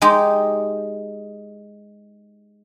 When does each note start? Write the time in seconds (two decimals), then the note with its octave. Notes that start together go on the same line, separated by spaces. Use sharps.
0.02 G#3 D#4 G4